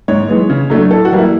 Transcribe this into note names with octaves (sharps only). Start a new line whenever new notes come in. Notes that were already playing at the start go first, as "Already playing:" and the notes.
G#2 C#5
E3 G#3 B3
C#3
F#3 A3 D4
A2 A4
F#4
E3 G3 A#3
E4